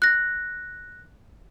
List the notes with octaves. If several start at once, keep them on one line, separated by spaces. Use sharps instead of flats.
F#6 A#6